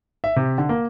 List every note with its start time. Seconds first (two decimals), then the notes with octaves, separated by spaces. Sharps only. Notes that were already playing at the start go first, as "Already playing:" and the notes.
0.24 E5
0.36 C3
0.58 D3
0.69 A#3